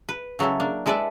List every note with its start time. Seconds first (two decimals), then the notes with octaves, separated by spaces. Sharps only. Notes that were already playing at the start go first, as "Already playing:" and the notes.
0.09 B4
0.39 C#3 F#3 G#3 E4 A4
0.60 A#3 D4
0.86 G#3 E4 A4 B4 D5 E5